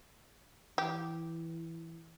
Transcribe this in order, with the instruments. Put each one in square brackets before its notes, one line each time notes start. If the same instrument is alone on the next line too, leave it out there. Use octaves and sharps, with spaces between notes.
[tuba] E3 [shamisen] G4